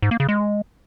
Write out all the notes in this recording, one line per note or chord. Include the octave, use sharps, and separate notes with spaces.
G#2
A#3
C#3
G#3